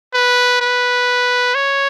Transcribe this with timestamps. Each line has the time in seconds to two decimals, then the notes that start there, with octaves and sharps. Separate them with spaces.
0.14 B4
0.61 B4
1.55 C#5